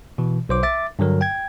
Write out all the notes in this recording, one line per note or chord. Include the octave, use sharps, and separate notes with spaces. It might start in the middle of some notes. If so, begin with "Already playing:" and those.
B2 E3
B1 C5 D6
E5 D6 A6
G2 D3 F#3 A#4
G5 G#6